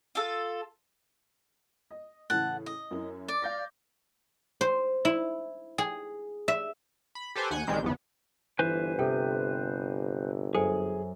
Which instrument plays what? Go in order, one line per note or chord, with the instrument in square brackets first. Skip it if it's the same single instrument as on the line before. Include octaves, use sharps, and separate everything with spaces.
[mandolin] F4 A4
[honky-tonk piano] D#5
[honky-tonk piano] A2 C#3 E3 [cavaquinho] F#5 A5
[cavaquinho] D#5
[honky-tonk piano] F#2 E4
[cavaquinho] D5
[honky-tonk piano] F5 G6 A#6
[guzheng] C5
E4
G#4
E5
[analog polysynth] B5
G4 A4 B4 C5 G#5
D#2 F#5 G#5 G6
A1 D#3 G3 G#3 C4 G6
G1 E2 B3
[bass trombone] G1 [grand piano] E3 [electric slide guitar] B4 C5 G#5
[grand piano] C3 [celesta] A4 G5
[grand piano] F#2 [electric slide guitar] G#4 [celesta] A4 C5 G#5